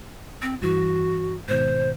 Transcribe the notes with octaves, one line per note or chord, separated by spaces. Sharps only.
C4
G2 E3 F#4
G#2 B2 D#3 C5